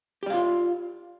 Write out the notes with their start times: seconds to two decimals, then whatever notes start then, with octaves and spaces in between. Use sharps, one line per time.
0.23 G4
0.26 D5
0.30 F5
0.34 F4